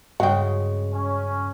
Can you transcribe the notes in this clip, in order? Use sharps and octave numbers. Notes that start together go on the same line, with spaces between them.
G2 C#3 G#3 F#4 F#5 G5
C#4